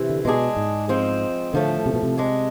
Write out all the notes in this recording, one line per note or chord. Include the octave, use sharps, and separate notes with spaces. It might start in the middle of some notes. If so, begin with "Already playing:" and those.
Already playing: C3 E3
D3
B2 G#3 D4 G#4
G#2
F3 G#3 C4
A2 D3 F3 A3
C3
B2
C3
G#3 D4 G#4